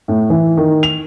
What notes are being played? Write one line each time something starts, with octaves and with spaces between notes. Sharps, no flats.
A2
E3
D#3
F7